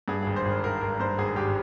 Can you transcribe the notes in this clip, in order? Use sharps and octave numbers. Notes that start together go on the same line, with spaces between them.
G2 G#4
G#4
G#1
C5
G#1 A#4
G#1 A#4
G#1 A#4
G2 C5
G#1 G#4
G#1 G4